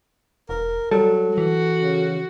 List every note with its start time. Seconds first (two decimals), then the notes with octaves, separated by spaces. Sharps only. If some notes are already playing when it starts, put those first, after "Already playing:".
0.49 E1 A#4
0.91 F#3 G3 A4
1.38 E3 F#4
1.80 C#3